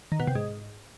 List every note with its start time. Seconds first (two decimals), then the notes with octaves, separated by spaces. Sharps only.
0.12 D#3
0.20 B2
0.27 C3
0.35 G#2